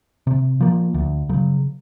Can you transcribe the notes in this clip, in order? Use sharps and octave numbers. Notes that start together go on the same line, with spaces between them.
C3
F3 A#3
D2
C#3 F#3